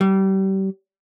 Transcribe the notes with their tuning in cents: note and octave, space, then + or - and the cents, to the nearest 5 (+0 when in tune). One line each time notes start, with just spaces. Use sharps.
G3 -30